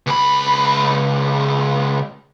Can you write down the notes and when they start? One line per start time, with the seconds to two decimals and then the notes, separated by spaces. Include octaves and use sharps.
0.07 C#2 B5